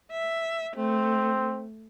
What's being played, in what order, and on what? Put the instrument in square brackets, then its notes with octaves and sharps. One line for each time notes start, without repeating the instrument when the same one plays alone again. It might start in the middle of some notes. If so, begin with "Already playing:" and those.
[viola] E5
[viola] A3 [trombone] C4